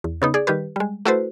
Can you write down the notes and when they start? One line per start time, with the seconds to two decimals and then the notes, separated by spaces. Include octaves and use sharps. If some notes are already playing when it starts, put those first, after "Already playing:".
0.04 E2
0.22 C#3 B3 D#4
0.34 G#4 D5
0.47 D#3 G3 G4 B4
0.76 G3 G#3
1.05 A3 E4 F#4 A4 B4 C5